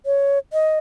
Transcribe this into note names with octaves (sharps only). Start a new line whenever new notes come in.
C#5
D#5